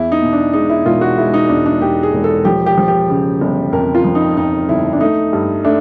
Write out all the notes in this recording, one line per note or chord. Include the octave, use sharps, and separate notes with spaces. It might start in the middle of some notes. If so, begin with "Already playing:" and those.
Already playing: E2 E4
D#4
B2
D4
G#3 D#4
E4
E1 F4
F#4
G#3 E4
D#4
E2 D4
D4
E2 G4
G#4
E1
A4
F3 G4
G4
F3
G4
C#3
G1
F2 A#4
F4
F3
D#4
F2 D#4
G1 E4
D4
A3 D#4
G2
A3 D4